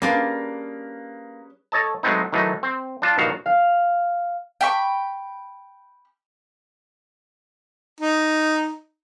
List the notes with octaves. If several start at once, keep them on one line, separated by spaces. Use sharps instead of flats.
G3 A#3 C#4 D4 F4 G#4 B4
A4 C#5 D#5 A5
F#3 G#3 A3 B3 C4 D#4
D#3 E3 F#3 A3 D#4
C4
D4 F4 A5
A#1 G2 D#3 F#4 F5
F5
G5 B5 C#6
D#4